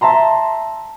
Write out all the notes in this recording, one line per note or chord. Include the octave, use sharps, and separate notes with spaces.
E5 A5 A#5 C6